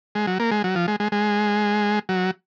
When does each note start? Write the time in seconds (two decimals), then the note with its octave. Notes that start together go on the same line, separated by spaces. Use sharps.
0.15 G#3
0.27 F#3
0.40 A#3
0.51 G#3
0.64 F#3
0.75 F3
0.88 G#3
1.00 G#3
1.12 G#3
2.09 F#3